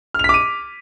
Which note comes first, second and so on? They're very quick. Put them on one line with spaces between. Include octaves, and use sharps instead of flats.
F6 F7 B6 D6 D#7